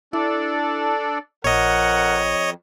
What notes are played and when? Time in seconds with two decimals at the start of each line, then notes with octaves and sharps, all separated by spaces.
0.13 D4 E4 A4 D5
1.44 A#1 F2 A#4 C#5 D#5 F#5